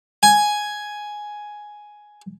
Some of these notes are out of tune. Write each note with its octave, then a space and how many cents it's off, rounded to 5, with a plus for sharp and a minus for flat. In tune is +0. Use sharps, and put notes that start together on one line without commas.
G#5 +5